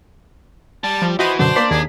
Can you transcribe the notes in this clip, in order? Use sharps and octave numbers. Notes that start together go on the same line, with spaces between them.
G3 A5
F3
E3 F#4 C5 D#5 B5
F#2 B2 D3 D4 C5
A#3 D5 C6 B6
D#2 G#4